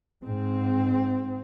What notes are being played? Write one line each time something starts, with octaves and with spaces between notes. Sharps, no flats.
G#2 C4